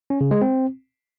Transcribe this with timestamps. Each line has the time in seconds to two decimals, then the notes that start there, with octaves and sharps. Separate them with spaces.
0.10 C#4
0.21 C#3
0.31 G#3
0.42 C4